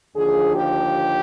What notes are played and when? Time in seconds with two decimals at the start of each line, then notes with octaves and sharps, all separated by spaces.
0.16 D#2 D3 F3 G#4
0.56 G4